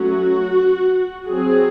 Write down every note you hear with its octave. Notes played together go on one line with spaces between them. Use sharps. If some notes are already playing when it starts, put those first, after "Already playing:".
Already playing: F#3 A3 C#4 F#4
F#3 C4 G#4